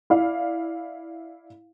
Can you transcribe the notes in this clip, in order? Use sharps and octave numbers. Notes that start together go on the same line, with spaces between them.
E4 D5 F5